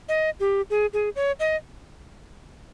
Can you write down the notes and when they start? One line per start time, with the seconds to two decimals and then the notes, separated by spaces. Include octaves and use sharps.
0.09 D#5
0.40 G4
0.70 G#4
0.93 G#4
1.16 C#5
1.40 D#5